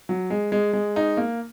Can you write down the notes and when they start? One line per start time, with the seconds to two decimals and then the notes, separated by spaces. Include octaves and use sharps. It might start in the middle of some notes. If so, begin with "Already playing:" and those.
0.09 F#3
0.30 G#3
0.52 G#3
0.73 G#3
0.96 D#4
1.17 A#3